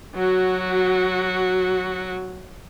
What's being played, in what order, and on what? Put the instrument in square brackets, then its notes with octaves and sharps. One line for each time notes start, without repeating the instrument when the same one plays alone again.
[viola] F#3 F#4